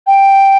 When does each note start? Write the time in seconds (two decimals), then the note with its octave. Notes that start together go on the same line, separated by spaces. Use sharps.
0.07 G5